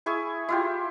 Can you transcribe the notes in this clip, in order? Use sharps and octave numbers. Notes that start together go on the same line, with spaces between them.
E4 G#4 G#5 C#6
E4 F4 G4